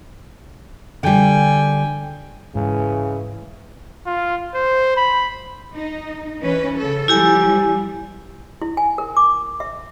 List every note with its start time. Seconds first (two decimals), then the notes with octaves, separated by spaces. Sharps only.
1.03 D3 G3 G5 G#5
2.55 G#2 C#3 E3
4.06 F4
4.55 C5
4.97 B5
5.74 D#4
6.41 E3 C#4 B4
6.78 C#3 A4
7.08 F3 G3 E4 G4 G#5
8.62 E4
8.77 G#5
8.98 A#4
9.17 D6
9.60 E5